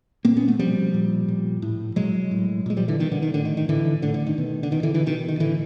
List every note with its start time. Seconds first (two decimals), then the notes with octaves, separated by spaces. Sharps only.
0.25 A#2 A#3 C4
0.37 B3 C#4
0.48 A3 B3
0.59 B2 F3 G3
0.94 A#2
1.28 A#2
1.62 A2
1.96 B2 F#3 G#3
2.31 A2
2.66 A#2 G#3
2.76 F3 G3
2.88 D3 E3
2.99 B2 D#3
3.12 D3
3.22 D#3
3.34 A2 D3
3.45 D#3
3.57 D#3
3.68 A2 D3 E3
4.02 A2 D3
4.14 D3
4.27 D#3
4.38 B2
4.63 D3
4.71 B2 D#3
4.83 D3 E3
4.94 D3 E3
5.06 B2 D#3
5.28 D#3
5.40 A2 D3 E3